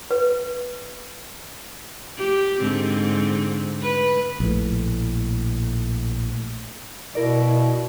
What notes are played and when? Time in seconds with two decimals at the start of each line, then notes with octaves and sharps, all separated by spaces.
0.11 B4
2.18 G4
2.60 G#2 D3 C4
3.82 B4
4.40 A#1 A2
7.15 B2 E4 A#4 D5